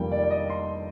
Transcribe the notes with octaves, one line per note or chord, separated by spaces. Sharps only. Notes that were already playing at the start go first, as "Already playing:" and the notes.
Already playing: F1 F2 D#3 G3 A#3 G5
D5
D5
D#5
C6